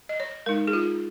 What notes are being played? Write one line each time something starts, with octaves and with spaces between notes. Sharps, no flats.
D#5
C#5
G#3 D#4 A#4
G#4
F4